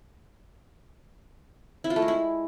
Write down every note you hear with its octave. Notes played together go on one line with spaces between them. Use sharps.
E4
F4
A3
G#3
E4